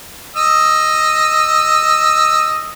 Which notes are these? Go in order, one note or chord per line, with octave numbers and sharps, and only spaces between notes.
D#5 E6